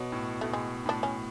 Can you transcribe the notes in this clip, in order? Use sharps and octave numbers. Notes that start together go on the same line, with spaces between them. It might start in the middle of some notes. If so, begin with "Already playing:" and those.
Already playing: B2 F#3
A2
B2 A3
A2 G#3
A2 D4
C#4